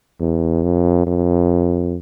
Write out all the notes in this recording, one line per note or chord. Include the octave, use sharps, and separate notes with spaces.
E2
F2
F2